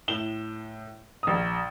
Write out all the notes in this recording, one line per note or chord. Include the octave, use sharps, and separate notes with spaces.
A2 E7 G7
A#1 D#6